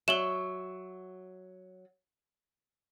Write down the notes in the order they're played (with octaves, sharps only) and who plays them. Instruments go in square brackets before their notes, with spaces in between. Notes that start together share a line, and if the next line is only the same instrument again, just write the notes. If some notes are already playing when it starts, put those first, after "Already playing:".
[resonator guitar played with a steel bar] F#3 E5 [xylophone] E7 F#7 G7